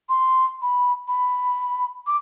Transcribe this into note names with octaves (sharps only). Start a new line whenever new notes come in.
C6
B5
B5
D6